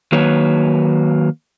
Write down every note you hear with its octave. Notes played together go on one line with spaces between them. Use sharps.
D#3 F#3 A#3 B4 C#5